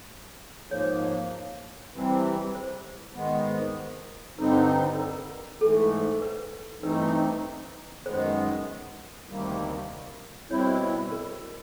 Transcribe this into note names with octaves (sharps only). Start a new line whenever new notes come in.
G#2 F3 A#3 C#5
C3 E3 G3 C4
C5
G#2 D#3 G#3 B3
G2 D3 G3 C4 D#4 B4
B4
A#4
G#2 E3 A3 A4
B4
G2 E3 A3 C4 D#4 B4
F#2 D#3 G#3 B3 C5
D2 C3 D#3 G3 A#3
B2 G3 C4 E4 C#5
C5
B4
C5
A#4